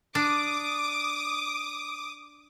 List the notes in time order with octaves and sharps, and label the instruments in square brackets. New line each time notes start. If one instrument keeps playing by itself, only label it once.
[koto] D4 [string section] D6 D#6